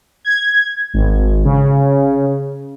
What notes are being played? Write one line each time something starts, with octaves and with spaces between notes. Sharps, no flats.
G#6
G#1
C#3